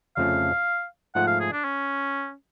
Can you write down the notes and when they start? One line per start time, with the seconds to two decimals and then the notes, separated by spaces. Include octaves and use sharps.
0.17 F2 C#3 F3 A3 C#4 F5
1.15 G#2 F3 A3 F4 F#5
1.28 F5
1.40 G#4
1.53 D4
1.64 C#4